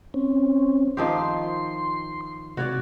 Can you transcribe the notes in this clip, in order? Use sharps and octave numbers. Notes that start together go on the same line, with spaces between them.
C4 C#4
D#3 F3 G4 C6
C3 F#4 C#5 D5